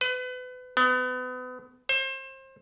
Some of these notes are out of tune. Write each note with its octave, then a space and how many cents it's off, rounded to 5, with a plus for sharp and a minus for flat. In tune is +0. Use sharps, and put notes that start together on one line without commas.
B4 +30
B3 +35
C5 +30